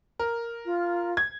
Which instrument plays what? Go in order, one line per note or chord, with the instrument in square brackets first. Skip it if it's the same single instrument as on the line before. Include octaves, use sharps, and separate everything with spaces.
[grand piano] A#4
[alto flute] F4
[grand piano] G#6